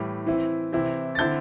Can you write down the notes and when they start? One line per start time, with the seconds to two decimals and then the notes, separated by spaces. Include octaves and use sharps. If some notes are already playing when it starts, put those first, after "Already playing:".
Already playing: A2 E3 G3
0.26 E3 C4 E4
0.72 C3 E3 C4 E4
1.15 A6
1.19 D3 C4 E4 G6